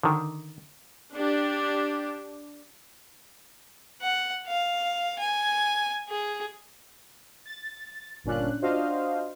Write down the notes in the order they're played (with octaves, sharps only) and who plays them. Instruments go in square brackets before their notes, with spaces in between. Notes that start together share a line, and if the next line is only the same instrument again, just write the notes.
[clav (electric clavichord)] D3 D#3
[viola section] D4 G4
[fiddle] F#5
F5
G#5
G#4
[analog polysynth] A6
G1 A#2 C#4 D4 F4 F#6
D4 F4 F#4 C5 D#5 F5